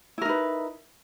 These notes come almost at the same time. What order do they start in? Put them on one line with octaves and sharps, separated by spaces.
E4 A#4 D#4 B4